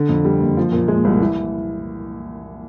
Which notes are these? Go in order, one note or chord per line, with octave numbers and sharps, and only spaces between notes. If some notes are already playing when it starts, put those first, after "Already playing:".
Already playing: D3
F2
G3
F#1
F3
A#2
G#3
C2
E3